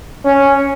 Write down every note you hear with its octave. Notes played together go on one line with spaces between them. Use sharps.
C#4